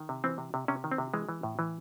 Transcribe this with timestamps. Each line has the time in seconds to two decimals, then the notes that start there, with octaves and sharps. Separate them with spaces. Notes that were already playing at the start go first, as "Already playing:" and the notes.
Already playing: D#3
0.09 C3
0.24 E3 C4
0.38 C3
0.54 C3
0.68 C3 C#4
0.84 D#3
0.92 C4
0.98 C3
1.14 E3 G#3
1.29 E3
1.43 A2
1.59 E3